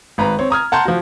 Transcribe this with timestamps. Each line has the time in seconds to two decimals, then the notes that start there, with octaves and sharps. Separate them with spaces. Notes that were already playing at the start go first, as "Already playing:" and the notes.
0.18 G#1 B4 A#5
0.39 C4 C#5
0.50 A#5 D#6 F6 G#6
0.72 F#5 A5 A#5 C6 G6
0.85 F3 F#4